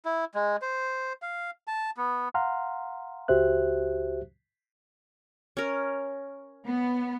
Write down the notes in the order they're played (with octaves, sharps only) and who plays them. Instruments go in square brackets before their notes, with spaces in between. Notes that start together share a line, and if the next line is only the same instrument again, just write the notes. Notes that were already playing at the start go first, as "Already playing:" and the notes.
[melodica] E4
G#3
C5
F5
A5
B3
[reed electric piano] F5 F#5 A#5 C6 F6
C#2 F#4 G4 C5 E5 F#6
[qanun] C#4 A#4
[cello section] B3